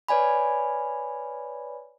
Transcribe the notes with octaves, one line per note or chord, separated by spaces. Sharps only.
B4 C#5 D5 G#5 B5